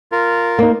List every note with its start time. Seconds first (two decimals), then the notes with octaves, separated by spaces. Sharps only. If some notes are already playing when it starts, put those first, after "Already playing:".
0.12 F4 A#4
0.59 A#3 D#4